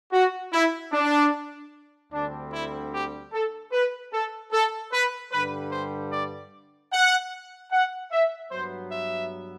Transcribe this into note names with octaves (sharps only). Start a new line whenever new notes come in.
F#4
E4
D4
D2 D3 G3 C4 D4
E4
G4
A4
B4
A4
A4
B4
G2 D3 G3 B4
C5
D5
F#5
F#5
E5
G2 F#3 B3 C5
E5